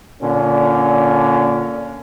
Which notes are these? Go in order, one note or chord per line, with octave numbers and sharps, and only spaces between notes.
A#2 D3 C#4